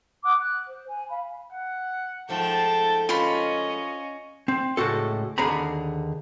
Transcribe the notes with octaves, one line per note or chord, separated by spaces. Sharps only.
F#5 D6 D#6 F#6
F#6
C5
G#5
F5 B5
F#5
G#2 F3 A3 G5 A5
C#4 F4 D#5 B5
C4
C#2 A2 F#4 A4
D#2 D3 G#4 A#5 B5